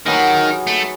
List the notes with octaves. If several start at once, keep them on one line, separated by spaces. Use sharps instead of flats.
D#3 F#3 B3 D#4 G#4
A3